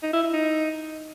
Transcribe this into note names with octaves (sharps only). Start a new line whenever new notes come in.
D#4
E4
E4
D#4